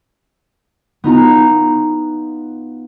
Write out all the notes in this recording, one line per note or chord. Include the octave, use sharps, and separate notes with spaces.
B3 D#4 F4 A#5